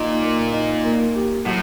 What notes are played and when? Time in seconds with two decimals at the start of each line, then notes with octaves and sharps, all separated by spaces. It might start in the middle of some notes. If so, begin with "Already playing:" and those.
Already playing: A#2 D#4
0.23 A#3
0.53 D#4
0.84 A#3
1.16 G4
1.45 A2 F#3